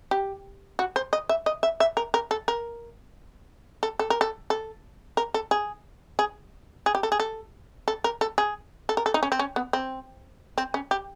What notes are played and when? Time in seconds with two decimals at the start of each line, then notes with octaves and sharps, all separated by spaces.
0.11 G4
0.79 F#4
0.96 C5
1.13 D#5
1.29 E5
1.46 D#5
1.63 E5
1.80 E5
1.97 A#4
2.14 A#4
2.31 A4
2.48 A#4
3.83 A4
3.99 A4
4.10 A#4
4.21 A4
4.50 A4
5.17 A#4
5.34 A4
5.51 G#4
6.19 G#4
6.86 G#4
6.95 G4
7.03 A4
7.12 G#4
7.20 A4
7.88 A4
8.04 A#4
8.21 A4
8.38 G#4
8.89 A4
8.97 A#4
9.06 A4
9.14 D#4
9.23 C#4
9.32 C4
9.39 C#4
9.56 B3
9.73 C4
10.58 C4
10.74 C#4
10.91 G4